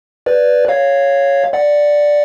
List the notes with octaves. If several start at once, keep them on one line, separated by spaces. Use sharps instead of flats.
B4 D5
C#5 F5
D5 F#5